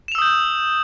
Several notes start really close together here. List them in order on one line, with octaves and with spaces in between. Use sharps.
E7 F7 E6 D#6 G6